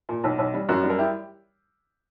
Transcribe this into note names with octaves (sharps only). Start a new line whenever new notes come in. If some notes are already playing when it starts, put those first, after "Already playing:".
A#2
B1
B1
G3
F#2 F#4 A#4
G3
A#4
E4 G4